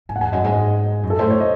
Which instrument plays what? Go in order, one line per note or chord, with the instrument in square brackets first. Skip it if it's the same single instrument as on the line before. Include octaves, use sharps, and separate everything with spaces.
[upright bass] G#2 [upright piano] G#5
[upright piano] F#5
[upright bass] E2 [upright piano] G#5
[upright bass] F#2 [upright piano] D#5
[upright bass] G#2 [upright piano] D#5
[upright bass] F#2
[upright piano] A4
[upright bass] A2 [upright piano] C5
[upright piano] C#5
D#5